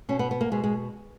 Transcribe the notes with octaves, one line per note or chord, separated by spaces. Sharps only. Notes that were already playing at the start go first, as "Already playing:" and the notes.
B2 C#4
B3
B3
A#3
B2 G#3
G#3